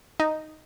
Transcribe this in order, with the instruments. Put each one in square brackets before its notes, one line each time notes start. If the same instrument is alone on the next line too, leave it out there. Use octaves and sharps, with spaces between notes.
[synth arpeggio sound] D#4